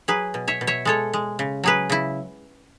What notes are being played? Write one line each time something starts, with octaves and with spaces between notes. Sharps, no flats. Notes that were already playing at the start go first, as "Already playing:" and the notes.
F#3 G#4 B4
B2
C#5 E5
B2
C#5 E5
G#3 A4 C#5
G#3
C#3
F#3 G#4 B4
C#3 E4